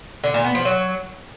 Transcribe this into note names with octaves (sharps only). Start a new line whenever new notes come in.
D3
A#2
B3
F3
F#3